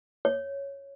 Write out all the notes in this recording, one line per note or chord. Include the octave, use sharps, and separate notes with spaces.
C#5